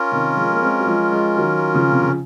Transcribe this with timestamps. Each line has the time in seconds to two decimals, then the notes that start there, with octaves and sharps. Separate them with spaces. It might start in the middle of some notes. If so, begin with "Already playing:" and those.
Already playing: C#4 F4 A#4
0.12 C3 D#3
0.37 F3 G#3
0.51 A#3
0.62 G#3 C4
0.79 F#3
0.87 F3 G#3
1.12 F3 G#3
1.37 D#3 F#3
1.74 C#3 F3
1.91 C3
2.01 C#3